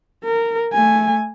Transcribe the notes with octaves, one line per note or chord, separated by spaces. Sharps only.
A#4
A3 G#5